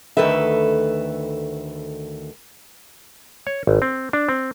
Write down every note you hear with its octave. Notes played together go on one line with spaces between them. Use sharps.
D2 G#2 D#3 A4 B4 E5
C#5
G#1
C4
D4
C4